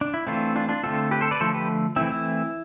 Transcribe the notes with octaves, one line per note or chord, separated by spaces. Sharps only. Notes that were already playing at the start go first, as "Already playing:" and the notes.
D4
E4
E3 A3 C4 D4 F4
D4 F4
D4 F4
D3 A3 C4 F4 A4
G4 B4
A4 C5
B4 D5
D3 F3 A3 A4 C5
G4 B4
E3 A3 C4 E4
E4